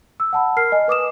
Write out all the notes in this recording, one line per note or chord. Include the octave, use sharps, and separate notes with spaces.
E6
F#5 A5 B5
A#4 F6 C7
D#5 G#5
B4 D6 D#6 E7